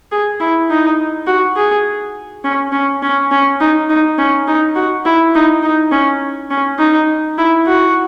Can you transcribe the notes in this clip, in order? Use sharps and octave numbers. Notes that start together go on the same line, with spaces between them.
G#4
E4
D#4
F#4
G#4
C#4
C#4
C#4
C#4
D#4
D#4
C#4
D#4
F#4
E4
D#4
D#4
C#4
C#4
D#4
E4
F#4